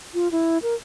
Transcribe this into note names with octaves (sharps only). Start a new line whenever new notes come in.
F4
E4
A#4